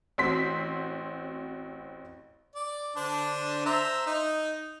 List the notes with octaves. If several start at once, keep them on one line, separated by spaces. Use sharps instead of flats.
A1 C4 F#4 C6 B6
D5
D3 D4 C5
C5 E5 A#5
D#4